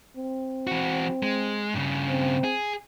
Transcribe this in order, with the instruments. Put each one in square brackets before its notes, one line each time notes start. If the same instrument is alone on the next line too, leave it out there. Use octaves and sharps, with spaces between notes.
[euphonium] C4
[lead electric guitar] E3 F#4
G#3
G2 C#3
[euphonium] C4
[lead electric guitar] G#4